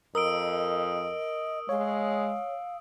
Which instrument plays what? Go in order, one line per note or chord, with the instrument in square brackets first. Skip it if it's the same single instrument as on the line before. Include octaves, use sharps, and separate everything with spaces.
[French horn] F2 [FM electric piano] A#4 [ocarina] D#5 [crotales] D#6 E6 D7
[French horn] G#3 [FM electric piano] C#5 [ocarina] F5